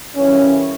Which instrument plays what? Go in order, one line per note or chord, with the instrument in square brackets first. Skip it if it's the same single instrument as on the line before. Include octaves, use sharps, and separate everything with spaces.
[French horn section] F#2 C#3 E3 G3 C#4